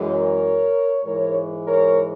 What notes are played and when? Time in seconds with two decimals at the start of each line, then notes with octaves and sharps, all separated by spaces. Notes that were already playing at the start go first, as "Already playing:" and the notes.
Already playing: F#2 E3 G#3
0.09 A#4 C#5
1.04 G#2 E3 G#3 A#4 C#5
1.68 A#4 C#5